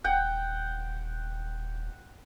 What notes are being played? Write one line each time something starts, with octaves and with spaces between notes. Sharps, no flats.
D#1 F#5 G5